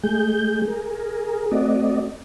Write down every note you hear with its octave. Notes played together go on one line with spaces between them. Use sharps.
G#3 A3 G#4 G6
G#4 A#4
A3 C4 F#4 D5 D#5